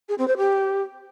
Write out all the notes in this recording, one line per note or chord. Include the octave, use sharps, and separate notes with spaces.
G#4
C4
C5
G4